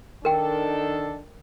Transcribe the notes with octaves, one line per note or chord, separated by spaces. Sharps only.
D#3 D4 A4 A#4 G5